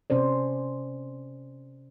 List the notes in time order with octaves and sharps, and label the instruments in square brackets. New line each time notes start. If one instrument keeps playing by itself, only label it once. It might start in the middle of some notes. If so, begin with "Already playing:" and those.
[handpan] C3 C#4 C5 D5